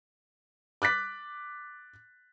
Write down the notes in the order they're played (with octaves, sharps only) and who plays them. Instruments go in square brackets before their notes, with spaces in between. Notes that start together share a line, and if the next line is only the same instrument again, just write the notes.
[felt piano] D6 F#6 A6 B6